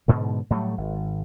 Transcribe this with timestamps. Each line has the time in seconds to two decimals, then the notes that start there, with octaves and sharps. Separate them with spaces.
0.08 G#2 B2 D3
0.50 A2 F#3 G3 A3
0.78 G#1